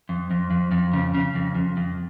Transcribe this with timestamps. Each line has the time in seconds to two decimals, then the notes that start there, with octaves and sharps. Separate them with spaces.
0.09 F2
0.31 F2
0.50 F2
0.71 F2
0.93 C#3
1.14 C#3
1.35 F2
1.55 F2
1.77 F2